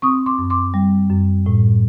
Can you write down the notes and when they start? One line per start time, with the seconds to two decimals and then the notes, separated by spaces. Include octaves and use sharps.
0.02 C4 C#6 D#6
0.26 C6 D6
0.39 F#2
0.50 C6 D6
0.74 G3
1.10 F#2
1.46 A2